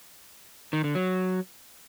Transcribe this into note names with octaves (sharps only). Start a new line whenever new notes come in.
D#3
D3
F#3